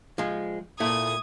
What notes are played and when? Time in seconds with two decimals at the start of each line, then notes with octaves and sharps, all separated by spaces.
0.18 F3 G#3
0.80 A#2 A3 E4 D#6 G#6